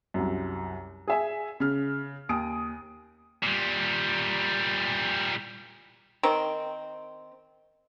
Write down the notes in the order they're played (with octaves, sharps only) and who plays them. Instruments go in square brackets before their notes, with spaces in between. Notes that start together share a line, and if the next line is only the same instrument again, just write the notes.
[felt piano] C2 F#2
G#4 E5 G#5
C#3 F6
D#2 G#5 D#6 D7
[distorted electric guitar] A#2 G3
[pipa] D#3 C4